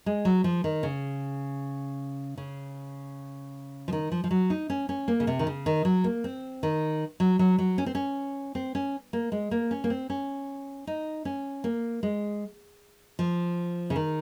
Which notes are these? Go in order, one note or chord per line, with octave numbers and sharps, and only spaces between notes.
G#3
F#3
F3
D#3
C#3
C#3
F3
D#3
F3
F3
F#3
D#4
C#4
C#4
A#3
C#3
C3
D#3
C#3
D#3
F#3
A#3
C4
D#3
F#3
F#3
F#3
C#4
C4
C#4
C4
C#4
A#3
G#3
A#3
C#4
A#3
C4
C#4
D#4
C#4
A#3
G#3
F3
C#3
D#3